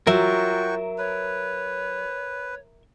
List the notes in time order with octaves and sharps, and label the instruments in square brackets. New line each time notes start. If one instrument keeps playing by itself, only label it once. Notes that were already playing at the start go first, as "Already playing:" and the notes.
[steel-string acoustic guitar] F#3 [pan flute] F4 [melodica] F#4 G5 C#6 [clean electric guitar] A#4 E5
[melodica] B4 [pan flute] C#5